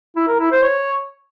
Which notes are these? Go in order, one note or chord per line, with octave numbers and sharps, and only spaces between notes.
E4
A#4
E4
C5
C#5